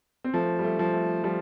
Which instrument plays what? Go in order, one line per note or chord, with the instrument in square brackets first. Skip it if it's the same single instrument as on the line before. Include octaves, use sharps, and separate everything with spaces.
[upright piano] C4
[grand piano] F3 [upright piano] A3
[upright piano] G3
A3
[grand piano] F3
[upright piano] A3
[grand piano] F3 [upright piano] G3